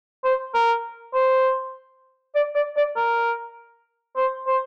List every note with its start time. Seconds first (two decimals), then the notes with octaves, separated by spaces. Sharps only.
0.24 C5
0.54 A#4
1.14 C5
2.35 D5
2.55 D5
2.76 D5
2.96 A#4
4.16 C5
4.47 C5